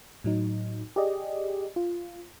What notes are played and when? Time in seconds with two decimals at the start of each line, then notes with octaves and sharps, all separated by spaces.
0.24 A2 F#3 D#4
0.96 G4 G#4 D5 D#5
1.76 F4